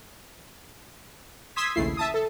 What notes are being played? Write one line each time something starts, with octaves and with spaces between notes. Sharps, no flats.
C6 D#6 E6 G#6 B6
A#1 D#2 C#3 A3 E4 C7
E5 A5 D#6
A4